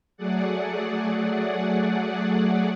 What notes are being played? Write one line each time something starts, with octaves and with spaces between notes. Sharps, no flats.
F#3 A3 G#4 D5 F#5